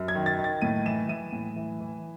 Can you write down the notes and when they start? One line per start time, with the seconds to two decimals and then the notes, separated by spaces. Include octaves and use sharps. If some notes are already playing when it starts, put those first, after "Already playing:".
Already playing: F#2
0.08 G#6
0.15 D#3
0.26 A6
0.39 D#3
0.44 A6
0.61 A2 D#7
0.86 E3 E7
1.09 E3 D#7
1.32 A2
1.56 E3
1.80 E3